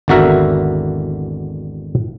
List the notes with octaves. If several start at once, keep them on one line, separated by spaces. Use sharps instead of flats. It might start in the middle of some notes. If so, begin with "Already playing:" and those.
G#1 E2 D3 F#4 A#4 E5